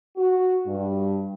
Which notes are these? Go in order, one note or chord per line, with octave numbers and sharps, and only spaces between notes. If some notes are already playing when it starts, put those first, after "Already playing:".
F#4
G2